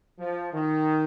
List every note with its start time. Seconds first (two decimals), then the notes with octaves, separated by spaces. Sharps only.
0.19 F3
0.53 D#3